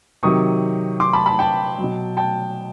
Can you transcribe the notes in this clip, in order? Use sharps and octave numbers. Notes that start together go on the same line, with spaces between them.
C3 D#3 F#3 C#6 D#6
C6 D6
A5 B5
A5 B5
G5 A5
B2 F#3
G5 A5